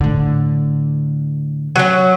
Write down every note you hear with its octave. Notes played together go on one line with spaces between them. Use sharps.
A2 D3
F#3 C#4